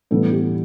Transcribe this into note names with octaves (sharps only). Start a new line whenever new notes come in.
A2 E3 G3 B3 A4
G4